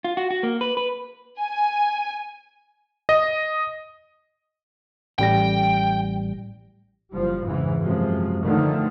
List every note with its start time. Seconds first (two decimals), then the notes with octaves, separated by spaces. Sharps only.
0.04 F4
0.17 F#4
0.31 F#4
0.43 A#3
0.61 B4
0.77 B4
1.40 G#5
3.09 D#5
5.19 A1 G3 G5 A#6
7.14 F#1 F3 G3
7.45 F2 G#2 C#3 E3
7.81 F#2 C3 F3 G#3
8.43 B2 D3 D#3 F3 A3